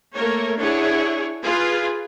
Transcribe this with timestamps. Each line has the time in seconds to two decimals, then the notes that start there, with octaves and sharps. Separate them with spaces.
0.14 A3 A#3 A#4 C#5
0.59 D4 E4 G#4 C#5 F#5
1.44 F4 G#4 B4